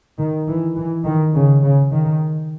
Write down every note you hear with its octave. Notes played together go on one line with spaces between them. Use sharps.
D#3
E3
E3
D#3
C#3
C#3
D#3